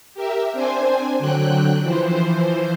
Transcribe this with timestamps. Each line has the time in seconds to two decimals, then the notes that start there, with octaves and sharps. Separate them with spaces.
0.14 G4 A#4 E5
0.52 C4 D4 C5 G#5
1.19 D3 F#3 G5 F#6
1.82 E3 F3 C5